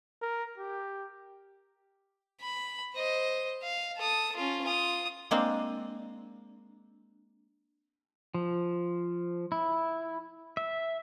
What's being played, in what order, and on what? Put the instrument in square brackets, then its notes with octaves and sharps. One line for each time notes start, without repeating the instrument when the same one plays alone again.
[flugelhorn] A#4
G4
[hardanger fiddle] B5
C5 D#5
F5
A4 D#6
C#4 F4
F4 D#6
[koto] G#3 A#3 C4 D4
[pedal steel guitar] F3
E4
E5